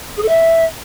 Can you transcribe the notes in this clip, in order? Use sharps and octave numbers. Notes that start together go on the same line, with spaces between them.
G#4
A4
E5